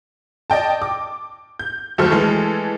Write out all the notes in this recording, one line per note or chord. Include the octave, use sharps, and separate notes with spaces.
D5 D#5 G5 A5
D6
G6
D#2 F#3 A3 A4 C5 F6
E3 G#3 A3 A4